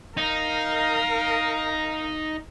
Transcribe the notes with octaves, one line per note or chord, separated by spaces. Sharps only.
D#4 A#4 F5